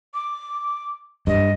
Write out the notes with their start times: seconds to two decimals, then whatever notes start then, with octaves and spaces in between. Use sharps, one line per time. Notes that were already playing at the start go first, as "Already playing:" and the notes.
0.14 D6
1.27 G2 D#5